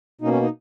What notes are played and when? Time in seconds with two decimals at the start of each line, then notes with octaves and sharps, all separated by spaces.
0.21 B2 A#3 C#4 D#4
0.31 C#4
0.42 D#4